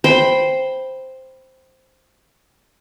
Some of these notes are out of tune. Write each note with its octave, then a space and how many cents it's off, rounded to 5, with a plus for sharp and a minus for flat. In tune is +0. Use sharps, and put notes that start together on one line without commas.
C5 +0 G5 +0 B5 +0